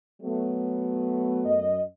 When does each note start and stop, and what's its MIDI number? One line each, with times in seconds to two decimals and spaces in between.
0.22 1.72 54
0.22 1.72 57
0.22 1.72 59
1.44 1.81 42
1.44 1.81 75